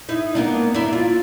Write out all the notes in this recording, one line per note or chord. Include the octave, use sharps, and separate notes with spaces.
D#4 E4
A#3 B3 D4
D4 E4
F4